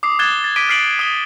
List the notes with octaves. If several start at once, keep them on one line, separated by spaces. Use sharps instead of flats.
D6 D#6 C7
D#6 F#6 G#6 A6 E7 G7
A6
D6 B6 D7 D#7 G7
F6 B6 C7 D7 F#7
D#6 E7 G7